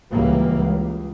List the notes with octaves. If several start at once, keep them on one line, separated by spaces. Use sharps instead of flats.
C#2 E3 F#3 G3 A#3
C#2